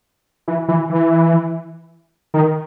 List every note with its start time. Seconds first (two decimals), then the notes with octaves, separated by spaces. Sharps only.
0.48 E3
0.68 E3
0.89 E3
2.34 D#3